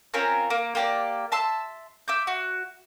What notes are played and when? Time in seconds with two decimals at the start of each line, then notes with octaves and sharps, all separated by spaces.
0.14 C4 C#4 F4 A#4
0.50 A#3
0.75 A#3 G4 D5
1.32 E5 A5 C6 E6
2.08 E5 D6 G6
2.27 F#4